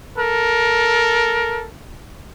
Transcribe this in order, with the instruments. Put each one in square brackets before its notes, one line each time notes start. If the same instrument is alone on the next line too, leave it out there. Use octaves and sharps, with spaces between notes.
[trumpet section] A4 A#4